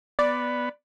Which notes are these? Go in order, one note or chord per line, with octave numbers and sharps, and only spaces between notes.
B3 D5